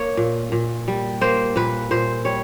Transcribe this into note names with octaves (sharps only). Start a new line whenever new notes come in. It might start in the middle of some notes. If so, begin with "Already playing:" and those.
Already playing: A#3 C#5
A#2
A#2
G3
A#3 C5
A#2 B4
A#2 C5
G3 C#5